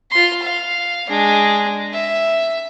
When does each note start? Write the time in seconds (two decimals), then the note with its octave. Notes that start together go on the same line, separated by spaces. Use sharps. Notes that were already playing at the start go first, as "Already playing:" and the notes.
0.11 F4 C6
0.43 F5
1.08 G#3 D4
1.93 E5